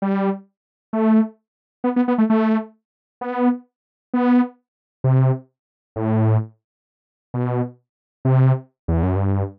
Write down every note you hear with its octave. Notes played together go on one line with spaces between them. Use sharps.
G3
A3
B3
B3
B3
A3
A3
B3
B3
C3
A2
B2
C3
E2
F#2
G2